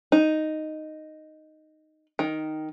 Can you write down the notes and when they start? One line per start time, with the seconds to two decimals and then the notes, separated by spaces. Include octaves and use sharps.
0.12 D#4
2.19 D#3